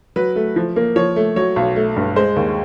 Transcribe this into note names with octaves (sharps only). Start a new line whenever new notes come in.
F#3 B4
A3
F3
A#3
F3 C#5
A3
F#3 C#5
B1
A3
G2
G#3 C5
D#2